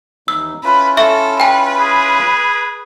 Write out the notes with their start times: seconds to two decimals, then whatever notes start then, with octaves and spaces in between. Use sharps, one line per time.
0.28 D#2 E3 D#4 E6
0.64 C#4 E4 F4 B4
0.97 A4 E5 C#6
1.40 B4 G5 G#5
1.80 G#4